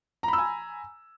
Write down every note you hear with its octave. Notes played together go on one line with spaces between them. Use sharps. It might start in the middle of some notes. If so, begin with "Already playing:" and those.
G#5 A#5 B5 E6